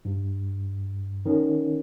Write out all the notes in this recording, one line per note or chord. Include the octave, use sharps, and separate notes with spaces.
G2
D#3 C#4